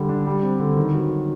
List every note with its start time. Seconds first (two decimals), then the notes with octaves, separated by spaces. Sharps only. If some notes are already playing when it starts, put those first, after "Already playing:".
Already playing: D3 G3
0.09 D4
0.27 G3
0.42 C4
0.60 D3
0.77 D#3
0.94 F#3